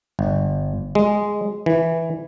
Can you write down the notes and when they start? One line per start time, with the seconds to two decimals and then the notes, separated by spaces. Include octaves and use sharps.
0.19 G1
0.95 G#3
1.66 E3